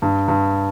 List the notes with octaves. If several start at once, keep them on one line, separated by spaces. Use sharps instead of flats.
G2
G2